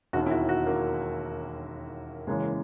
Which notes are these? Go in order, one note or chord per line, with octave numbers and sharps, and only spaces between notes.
E1 D#2 D#3 F#4
E4
F#4
F#4
A#3
F#1 F#2 C#3 E3 G#3